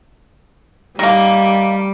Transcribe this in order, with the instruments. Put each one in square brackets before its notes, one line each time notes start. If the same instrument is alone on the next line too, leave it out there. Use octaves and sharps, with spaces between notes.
[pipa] D#3 A#3 [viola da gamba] G3